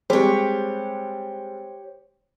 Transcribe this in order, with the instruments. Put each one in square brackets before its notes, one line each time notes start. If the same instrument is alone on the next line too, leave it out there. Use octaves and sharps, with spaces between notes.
[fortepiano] G3 G#3 C4 [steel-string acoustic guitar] G4 C#5 [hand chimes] C5